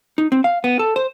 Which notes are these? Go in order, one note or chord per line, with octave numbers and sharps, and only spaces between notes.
D#4
C4
F5
B3
A4
C5